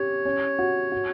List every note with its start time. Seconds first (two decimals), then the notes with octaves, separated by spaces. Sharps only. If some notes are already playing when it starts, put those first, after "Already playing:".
Already playing: C#4 G4 C#5
0.25 C#4
0.59 F#4
0.92 F#4